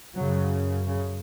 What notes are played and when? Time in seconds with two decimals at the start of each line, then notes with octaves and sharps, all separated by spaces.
0.15 F#2 C#3 F#3
0.86 C#3